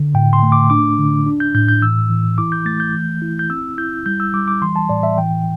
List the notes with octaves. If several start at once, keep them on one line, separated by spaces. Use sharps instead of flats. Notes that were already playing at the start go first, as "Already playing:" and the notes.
Already playing: D3
A2 G5
C6
A3
D6
D4 D6
D3
D4
G6
A2 G6
G6
E3 E6
E3
E4 D6
G6
A3 A6
G6
E3
E4
G6
C4 E6
E4 G6
G3 G6
E6
G3 D6
D6
E3 C6
A5
A2 D5
E5
E3 G5